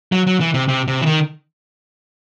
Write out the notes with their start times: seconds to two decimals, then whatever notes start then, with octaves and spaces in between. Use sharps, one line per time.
0.12 F#3
0.27 F#3
0.40 E3
0.54 C3
0.68 C3
0.88 C3
1.02 E3
1.06 D#3